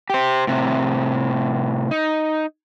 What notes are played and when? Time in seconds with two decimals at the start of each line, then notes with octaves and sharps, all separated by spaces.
0.10 G4 C5
0.47 A2 C3
1.91 D#4